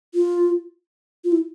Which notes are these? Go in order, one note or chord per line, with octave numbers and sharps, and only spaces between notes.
F4
F4
E4